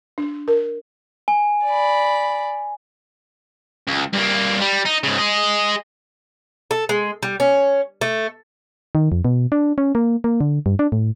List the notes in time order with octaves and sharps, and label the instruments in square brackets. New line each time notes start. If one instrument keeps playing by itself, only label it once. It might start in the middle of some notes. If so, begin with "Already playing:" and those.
[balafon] D4
A#4
[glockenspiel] G#5
[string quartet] D5 B5
[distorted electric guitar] C#2
G2 A#3
G3
D#4
G#2 C#3
G#4 D#5
[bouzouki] A4
G#3
G3
C#4
A3
[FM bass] D#3
F2
B2
D4
C#4
A#3
A#3
D3
G2
D4
A2